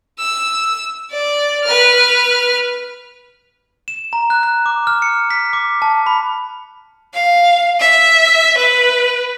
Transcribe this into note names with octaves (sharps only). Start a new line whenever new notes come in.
E6
D5
B4 F6
E7
A#5
F#6
F#6
D6
F6
C#7
B6
D6
A5
B5
F5
E5
B4